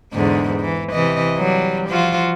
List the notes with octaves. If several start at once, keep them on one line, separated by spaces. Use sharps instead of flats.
E2 G#2 D3
E3
C3 E3 D#5
F#3 G3
F3 F4 F#4